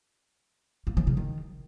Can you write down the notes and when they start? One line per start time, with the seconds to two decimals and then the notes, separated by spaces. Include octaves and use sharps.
0.87 A#3
0.97 E3
1.07 C#3
1.17 D#3